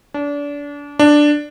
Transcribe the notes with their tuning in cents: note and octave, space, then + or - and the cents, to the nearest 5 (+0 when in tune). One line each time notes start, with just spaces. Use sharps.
D4 -30
D4 +5